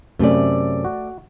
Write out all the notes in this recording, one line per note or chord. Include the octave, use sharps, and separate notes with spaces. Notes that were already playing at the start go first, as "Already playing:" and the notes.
F#2 C3 A3 C#4 D5
F#4